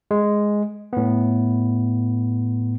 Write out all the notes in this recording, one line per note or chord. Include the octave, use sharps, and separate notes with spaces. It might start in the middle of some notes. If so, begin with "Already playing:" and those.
G#3
A2 B3